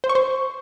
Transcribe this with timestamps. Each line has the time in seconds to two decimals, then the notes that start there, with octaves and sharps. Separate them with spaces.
0.04 C5
0.10 C#6
0.15 C5